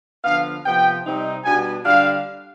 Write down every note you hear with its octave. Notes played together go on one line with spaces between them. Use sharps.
D3 F3 B3 F5
C3 F3 B3 G5
C3 G3 C4 D#4
B2 G3 B3 D4 G#5
D3 G3 D4 F5